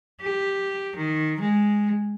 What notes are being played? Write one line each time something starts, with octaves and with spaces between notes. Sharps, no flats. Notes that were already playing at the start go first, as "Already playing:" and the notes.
G4
D#3
G#3